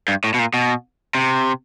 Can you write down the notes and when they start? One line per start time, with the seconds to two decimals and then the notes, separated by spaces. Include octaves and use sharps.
0.08 G2
0.24 A2
0.34 B2
0.39 A#2
0.54 B2
1.15 C3